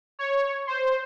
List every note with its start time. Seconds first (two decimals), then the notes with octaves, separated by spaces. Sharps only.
0.19 C#5
0.67 C5